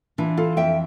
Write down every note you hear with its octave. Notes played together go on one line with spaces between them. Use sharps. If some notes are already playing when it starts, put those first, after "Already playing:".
E3 D4 F4
F4 A4
F2 E5 G5